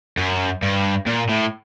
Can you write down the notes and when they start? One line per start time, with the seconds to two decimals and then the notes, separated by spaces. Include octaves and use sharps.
0.17 F#2
0.62 G2
1.07 A#2
1.29 A2